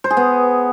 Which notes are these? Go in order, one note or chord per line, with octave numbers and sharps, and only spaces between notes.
C5
G#4
B3